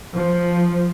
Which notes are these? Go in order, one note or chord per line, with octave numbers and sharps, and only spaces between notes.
F3